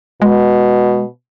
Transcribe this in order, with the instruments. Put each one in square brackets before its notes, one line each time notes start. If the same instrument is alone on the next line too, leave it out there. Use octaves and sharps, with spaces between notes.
[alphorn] B2 [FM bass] G#3